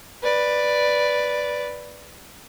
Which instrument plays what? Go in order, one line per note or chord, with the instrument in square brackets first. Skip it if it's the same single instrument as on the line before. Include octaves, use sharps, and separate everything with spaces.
[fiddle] B4 D5